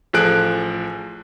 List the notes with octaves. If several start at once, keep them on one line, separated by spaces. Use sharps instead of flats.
A1 F3 G#4 A4 F#6 D7